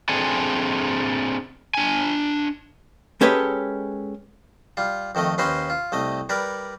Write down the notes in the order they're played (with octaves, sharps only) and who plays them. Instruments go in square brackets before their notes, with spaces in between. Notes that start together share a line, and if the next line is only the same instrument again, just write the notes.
[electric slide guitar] C4 D4 G#4 A4 G#5
D4 G#5
[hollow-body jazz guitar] G#3 C#4 G4 A4 B4 D#5
[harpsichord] G3 F4
F2 D#3 A3 D#5
D#2 C#4 B4 C5 D#5 C6
F4
C2 A3 D#5
G3 A#4 B4 D5